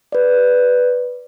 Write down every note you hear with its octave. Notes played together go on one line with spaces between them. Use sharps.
B4 D5